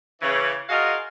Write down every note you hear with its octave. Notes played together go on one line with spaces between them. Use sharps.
C#3 E3
F4 F#4 G#4 A#4 D#5 F5